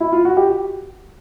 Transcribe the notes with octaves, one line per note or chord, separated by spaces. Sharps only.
E4
F4
F#4
G4